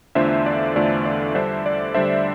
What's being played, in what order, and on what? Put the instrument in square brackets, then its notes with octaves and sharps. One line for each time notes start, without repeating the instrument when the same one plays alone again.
[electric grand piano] E2 D3 A3 D4 F4 C5 E5
D5
E2 D3 A3 D4 F4 D5
D5
D3 G3 D4 C5 E5
D5
D3 G3 D4 C5 E5